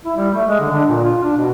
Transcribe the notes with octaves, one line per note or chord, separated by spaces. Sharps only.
E4
G3
A3
G#3
D3
D4
A#2
F4
D4
B2